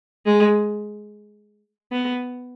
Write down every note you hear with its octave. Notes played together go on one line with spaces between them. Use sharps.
G#3
B3